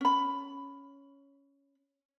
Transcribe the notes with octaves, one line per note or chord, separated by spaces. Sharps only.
C#4 B5